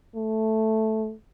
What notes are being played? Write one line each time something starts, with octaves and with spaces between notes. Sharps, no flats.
A3